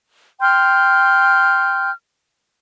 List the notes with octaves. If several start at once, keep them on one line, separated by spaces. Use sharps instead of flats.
G5 C6 F6 G6